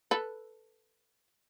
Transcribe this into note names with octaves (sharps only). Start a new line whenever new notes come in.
A4 B4